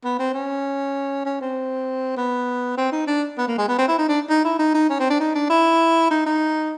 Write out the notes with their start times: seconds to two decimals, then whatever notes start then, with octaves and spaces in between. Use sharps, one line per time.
0.05 B3
0.19 C4
0.34 C#4
1.25 C#4
1.41 C4
2.17 B3
2.78 C4
2.92 D#4
3.07 D4
3.38 B3
3.48 A#3
3.58 G#3
3.68 B3
3.78 C4
3.88 E4
3.98 D#4
4.09 D4
4.29 D#4
4.45 E4
4.59 D#4
4.74 D#4
4.90 C#4
4.99 C4
5.10 D4
5.20 D#4
5.35 D4
5.50 E4
6.11 D#4
6.26 D#4